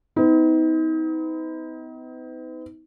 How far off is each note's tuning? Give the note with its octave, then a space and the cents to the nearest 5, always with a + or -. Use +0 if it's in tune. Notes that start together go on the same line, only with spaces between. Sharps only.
B3 +40 D#4 +40